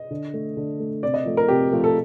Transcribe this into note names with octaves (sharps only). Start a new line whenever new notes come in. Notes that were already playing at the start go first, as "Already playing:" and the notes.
Already playing: D#5
D3
A3
D3
A3
C3 D5
D#5
F3 A3
A#4
C3 G4
F3 A3
A4